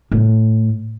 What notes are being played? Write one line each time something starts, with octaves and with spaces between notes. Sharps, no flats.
A2